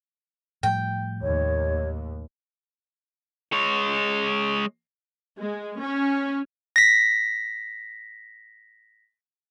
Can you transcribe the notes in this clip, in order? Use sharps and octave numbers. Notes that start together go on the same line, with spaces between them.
A2 F3 G3 G5
D#2 C#5
G#3 C#5
G#3
C#4
A#6 B6